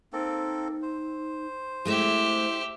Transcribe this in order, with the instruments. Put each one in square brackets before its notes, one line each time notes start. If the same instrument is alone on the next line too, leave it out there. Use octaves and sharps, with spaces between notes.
[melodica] A#3 C4 A4 [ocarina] D#4
[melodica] C5
[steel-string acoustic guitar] G#3 A3 C4 [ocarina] E4 [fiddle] G4 E5